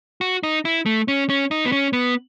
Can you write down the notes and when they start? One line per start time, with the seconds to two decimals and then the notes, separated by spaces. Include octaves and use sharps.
0.21 F#4
0.43 D#4
0.65 E4
0.86 A3
1.08 C#4
1.30 C#4
1.51 D#4
1.65 B3
1.72 C#4
1.93 B3